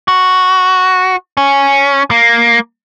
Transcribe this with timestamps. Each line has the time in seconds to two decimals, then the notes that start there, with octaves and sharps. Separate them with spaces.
0.08 F#4
1.37 C#4
2.11 A#3